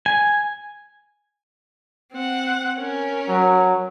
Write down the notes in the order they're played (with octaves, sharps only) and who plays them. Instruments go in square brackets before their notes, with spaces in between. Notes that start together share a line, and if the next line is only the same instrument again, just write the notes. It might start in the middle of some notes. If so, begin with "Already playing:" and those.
[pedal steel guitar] G#5
[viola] C4 F#5
C#4 A#4
[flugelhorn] F#3